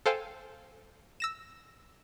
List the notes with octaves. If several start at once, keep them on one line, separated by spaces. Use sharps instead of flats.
A4 C5 F5 G5 G#5
E6 A#6 E7